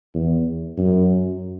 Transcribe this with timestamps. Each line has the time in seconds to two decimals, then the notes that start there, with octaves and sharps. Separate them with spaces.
0.14 E2
0.78 F#2